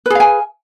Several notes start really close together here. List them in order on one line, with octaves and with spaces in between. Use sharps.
B4 G#4 F5 G#5